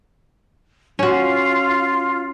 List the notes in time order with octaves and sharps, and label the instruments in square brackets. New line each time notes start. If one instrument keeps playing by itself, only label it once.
[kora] C#4 F#4 [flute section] F4